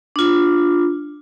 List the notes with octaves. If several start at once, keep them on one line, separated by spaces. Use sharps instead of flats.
D4 F4